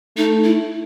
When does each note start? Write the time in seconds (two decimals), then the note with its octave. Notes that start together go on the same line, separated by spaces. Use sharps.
0.17 A3 D#4
0.44 E4